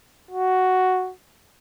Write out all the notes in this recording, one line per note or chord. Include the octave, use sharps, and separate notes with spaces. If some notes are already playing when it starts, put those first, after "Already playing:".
F#4